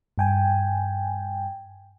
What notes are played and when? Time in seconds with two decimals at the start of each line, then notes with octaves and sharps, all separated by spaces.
0.18 G2 G5 G#5